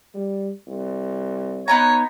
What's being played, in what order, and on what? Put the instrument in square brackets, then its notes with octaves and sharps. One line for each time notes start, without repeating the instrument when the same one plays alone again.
[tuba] G3
C2
[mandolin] B3 D#4 A#5 [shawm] C#5